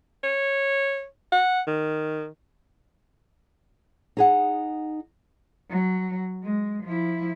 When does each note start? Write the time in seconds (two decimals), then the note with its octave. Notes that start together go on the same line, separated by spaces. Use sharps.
0.23 C#5
1.32 F#5
1.67 D#3
4.17 D#4 G#4 F#5
5.70 F#3
6.43 G#3
6.84 F3 E4